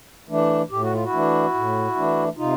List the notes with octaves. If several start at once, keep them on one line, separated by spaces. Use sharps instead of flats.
E3 A3 D4
A2 G4
F#4
F4
E4 F#4
E3 A3 D4
A2
E3 A3 D4
C3 D#4 F4